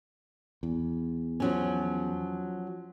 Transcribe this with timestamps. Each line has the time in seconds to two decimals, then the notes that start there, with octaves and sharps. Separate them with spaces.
0.63 E2
1.40 F3 F#3 C#4